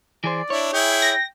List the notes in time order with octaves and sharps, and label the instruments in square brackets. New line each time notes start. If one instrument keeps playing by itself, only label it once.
[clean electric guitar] E3 G#4 C5 [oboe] D5
[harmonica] D4 E4 [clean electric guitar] C#5
[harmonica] E4 G#4 [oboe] G5
[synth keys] A#6